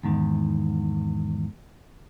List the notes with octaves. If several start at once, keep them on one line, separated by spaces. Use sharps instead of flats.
E2 G#2 D#3